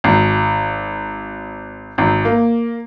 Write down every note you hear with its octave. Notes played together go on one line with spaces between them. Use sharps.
G#1
G#1
A#3